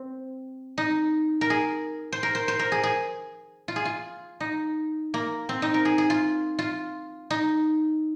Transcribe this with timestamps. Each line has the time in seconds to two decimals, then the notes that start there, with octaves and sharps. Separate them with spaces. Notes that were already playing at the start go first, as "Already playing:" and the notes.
Already playing: C4
0.78 D#4
1.41 A#4
1.50 G#4
2.12 C5
2.23 A#4
2.35 C5
2.48 C5
2.59 A#4
2.72 G#4
2.83 G#4
3.68 F4
3.76 G#4
3.85 F4
4.40 D#4
5.14 A#3
5.49 C4
5.62 D#4
5.74 A#4
5.85 G#4
5.98 G#4
6.10 F4
6.59 F4
7.30 D#4